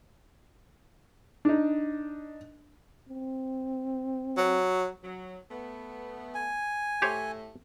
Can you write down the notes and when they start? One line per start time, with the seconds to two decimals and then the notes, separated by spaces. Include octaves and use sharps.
1.45 D4 D#4
3.09 C4
4.37 F#3
5.04 F#3
5.51 A3 B3
6.34 G#5
7.02 A2 A3 G4 C5 C#5